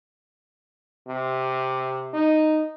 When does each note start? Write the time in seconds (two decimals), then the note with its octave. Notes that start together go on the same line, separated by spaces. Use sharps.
1.08 C3
2.13 D#4